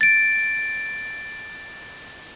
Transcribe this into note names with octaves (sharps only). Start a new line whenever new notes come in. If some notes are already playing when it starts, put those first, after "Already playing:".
A6 D7